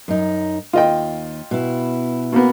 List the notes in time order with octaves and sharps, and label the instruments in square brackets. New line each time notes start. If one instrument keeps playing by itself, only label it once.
[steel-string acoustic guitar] F#2 D#4
[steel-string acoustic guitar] D#2 [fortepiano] F4 D#5 G5
[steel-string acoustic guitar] B2 E4
[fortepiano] B2 A#3 B3